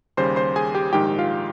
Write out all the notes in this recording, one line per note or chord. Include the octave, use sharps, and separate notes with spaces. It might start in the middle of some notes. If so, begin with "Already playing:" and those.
D#2 C#3 G3 C5 C6
C5 C6
G#4 G#5
G4 G5
A#1 G#2 D#3 G#3 G4 G5
F4 F5